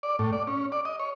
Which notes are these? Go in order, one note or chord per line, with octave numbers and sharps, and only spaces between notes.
D5
A2
D5
C#4
D5
D#5
C#5